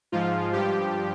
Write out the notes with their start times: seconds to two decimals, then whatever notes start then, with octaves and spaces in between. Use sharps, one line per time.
0.12 G#2 F3 F4
0.53 G2 F3 G4